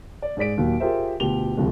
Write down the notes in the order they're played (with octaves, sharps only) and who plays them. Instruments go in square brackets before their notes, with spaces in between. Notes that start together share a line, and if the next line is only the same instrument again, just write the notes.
[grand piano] D5
G#2 G#4 D5 B6 D7
D#2 A#2 F#3
F4 G4 G#4 A#4 C5 E5
D2 B2 F4 G4 F7 G7
D1 C2 F3 G#3